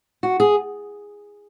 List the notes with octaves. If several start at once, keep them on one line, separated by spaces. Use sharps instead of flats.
F#4
G#4